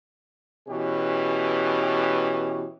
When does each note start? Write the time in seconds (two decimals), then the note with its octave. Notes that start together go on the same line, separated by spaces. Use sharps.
0.68 B2 E3 C#4 G4